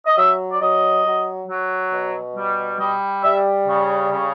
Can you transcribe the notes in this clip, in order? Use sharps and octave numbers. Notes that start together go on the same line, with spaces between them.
D#5
F#3 E5
D5
F#3 D#5
F#3
F#3
B2
G3
G3 D#5
G3 E5
C#3
C#3